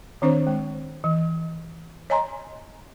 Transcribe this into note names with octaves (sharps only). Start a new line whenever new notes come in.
D#3 C4 D4 C5
G#3
E3
C#5 D#5 G#5 A#5 C6